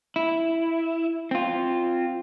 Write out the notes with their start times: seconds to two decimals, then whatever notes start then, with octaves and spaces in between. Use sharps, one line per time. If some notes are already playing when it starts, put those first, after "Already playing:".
0.16 E4
1.31 C4 F4